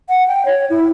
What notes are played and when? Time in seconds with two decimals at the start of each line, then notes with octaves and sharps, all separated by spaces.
0.09 F#5
0.28 G5
0.45 C#5
0.70 E4